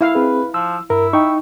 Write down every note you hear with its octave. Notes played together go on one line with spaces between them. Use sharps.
E4 F5
C4 G#4 B4
F3 E6
G2 E4 A#4
D#4 G5 C#6